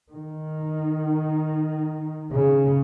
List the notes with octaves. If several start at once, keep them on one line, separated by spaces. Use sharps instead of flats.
D#3
C#3